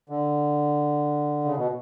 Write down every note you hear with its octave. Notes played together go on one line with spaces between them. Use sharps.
D3
C#3
B2